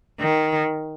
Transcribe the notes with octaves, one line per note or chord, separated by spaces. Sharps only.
D#3